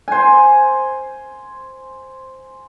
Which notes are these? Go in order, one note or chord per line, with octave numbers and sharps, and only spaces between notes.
C5 G#5